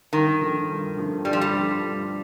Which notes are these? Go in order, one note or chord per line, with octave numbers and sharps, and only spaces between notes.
G2 D#3
D3 F3 A3
G2
D3 F3 A3
G2 G3
F3
G3
D3 F3 A3
G2